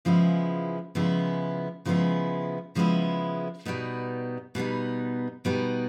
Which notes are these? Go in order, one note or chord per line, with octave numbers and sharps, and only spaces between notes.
C#3 F3 G#3 B3 E4
C#3 F3 G#3 B3 E4
C#3 F3 G#3 B3 E4
C#3 F3 G#3 B3 E4
B2 G3 B3 D#4
B2 G3 B3 D#4
B2 G3 B3 D#4